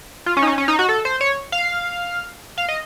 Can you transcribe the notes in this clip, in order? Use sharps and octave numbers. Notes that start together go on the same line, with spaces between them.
F4
C#4
D#4
C#4
C#4
D#4
F#4
A4
C5
C#5
F5
F5
D#5